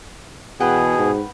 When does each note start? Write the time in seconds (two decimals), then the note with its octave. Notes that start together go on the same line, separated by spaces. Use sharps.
0.60 E2 B2 G#4 B4 F#5 G5
0.98 G#2